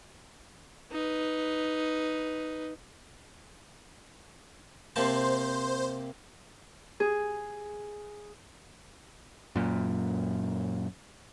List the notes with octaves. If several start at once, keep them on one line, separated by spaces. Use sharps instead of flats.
D#4 B4
C3 A#3 C5 A5
G#4
F#2 A#2